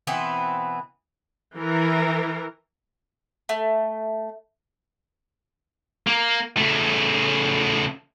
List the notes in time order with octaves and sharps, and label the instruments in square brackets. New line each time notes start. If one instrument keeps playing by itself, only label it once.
[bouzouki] B2 E3 B3 C4
[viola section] E3 A#4
[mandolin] A3
[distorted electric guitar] A#3
C#3 A3